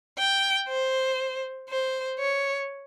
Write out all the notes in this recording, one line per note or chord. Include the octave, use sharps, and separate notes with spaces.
G5
C5
C5
C#5